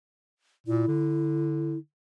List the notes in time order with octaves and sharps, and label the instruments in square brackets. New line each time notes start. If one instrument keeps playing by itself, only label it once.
[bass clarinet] A#2 [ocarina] E4
[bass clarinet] D3